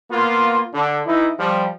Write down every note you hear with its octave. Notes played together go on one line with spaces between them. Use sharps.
A#3 B3 F4
D3
E3 D#4 E4
F3 G3